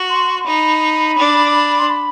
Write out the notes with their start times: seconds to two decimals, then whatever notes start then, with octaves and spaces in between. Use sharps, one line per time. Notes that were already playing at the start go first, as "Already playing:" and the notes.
Already playing: F#4
0.10 C6
0.40 C6
0.46 D#4 B5
1.18 D4
1.79 C6
1.89 B5